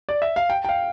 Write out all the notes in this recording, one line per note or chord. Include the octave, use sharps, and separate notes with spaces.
D5
E5
F5
G5
G5
F5